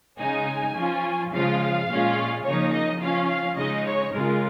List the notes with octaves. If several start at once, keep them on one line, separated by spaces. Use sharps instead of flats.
C#3 G#3 D#4 G#5
F3 C#4 F4
C#3 F3 G#3 F4 F5
A#2 G#3 C#4 F4
C#3 F3 A#3 D#4 C#5
D#5
F3 C#4 F4 F5
F5
C#3 G#3 D#4 D#5
C#5
C#3 G#3 F4 A#4